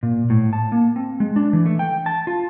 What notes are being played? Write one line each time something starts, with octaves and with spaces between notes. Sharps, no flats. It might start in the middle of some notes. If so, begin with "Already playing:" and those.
A#2
A2
A5
A#3
C4
G#3
D4
E3
A3
G5
A5
F4